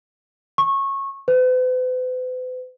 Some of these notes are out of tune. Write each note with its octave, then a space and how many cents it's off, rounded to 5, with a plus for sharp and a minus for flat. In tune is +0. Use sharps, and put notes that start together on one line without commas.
C#6 -20
B4 +45